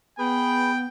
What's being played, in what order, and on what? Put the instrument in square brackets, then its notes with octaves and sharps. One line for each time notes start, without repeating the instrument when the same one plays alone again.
[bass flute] B3 [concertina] G#4 B4 [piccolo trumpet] G5